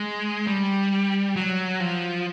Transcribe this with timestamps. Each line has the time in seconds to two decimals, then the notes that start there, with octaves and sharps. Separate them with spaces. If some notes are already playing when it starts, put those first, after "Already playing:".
Already playing: G#3
0.47 G3
1.36 F#3
1.80 F3